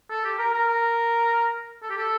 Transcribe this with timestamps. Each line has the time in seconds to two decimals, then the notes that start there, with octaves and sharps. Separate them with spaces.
0.10 A4
0.25 G4
0.39 A#4
0.53 A#4
0.68 A#4
1.83 A4
1.90 G4
1.97 A4